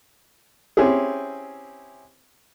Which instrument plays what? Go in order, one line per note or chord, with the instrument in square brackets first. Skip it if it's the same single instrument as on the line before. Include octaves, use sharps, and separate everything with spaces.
[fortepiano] C4 C#4 E4 G4 G#4